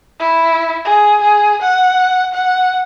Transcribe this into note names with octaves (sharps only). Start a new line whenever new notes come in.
E4
G#4
G#4
F#5
F#5